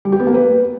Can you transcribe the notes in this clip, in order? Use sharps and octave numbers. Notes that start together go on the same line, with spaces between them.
G3
G4
B3
A#3
B4